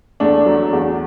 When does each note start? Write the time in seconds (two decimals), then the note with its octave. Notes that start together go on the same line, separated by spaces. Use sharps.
0.20 E2 A3 D4
0.46 F#3
0.73 E2